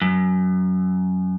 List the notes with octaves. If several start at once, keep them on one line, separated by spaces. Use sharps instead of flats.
F#2